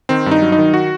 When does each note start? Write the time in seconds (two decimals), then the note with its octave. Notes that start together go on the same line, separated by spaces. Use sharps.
0.09 D#3 C4
0.26 G2
0.31 D#4
0.42 F#3
0.52 D#4
0.58 D#3
0.74 F#4